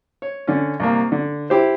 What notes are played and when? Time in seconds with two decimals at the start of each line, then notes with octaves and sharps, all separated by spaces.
0.22 C#5
0.47 D3 C#4
0.80 C2 A#3
1.12 D3
1.50 E4 G4 C5